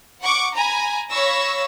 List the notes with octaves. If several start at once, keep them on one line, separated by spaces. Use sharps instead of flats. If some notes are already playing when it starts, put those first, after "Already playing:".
F#5 C#6 D6
G#5 A#5 B5
C#5 F5 B5 C#6 E6 A#6